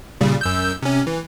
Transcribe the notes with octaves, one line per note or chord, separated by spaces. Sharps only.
A#2 C#3 G3
F#2 E6 G6
C3 C#4
E3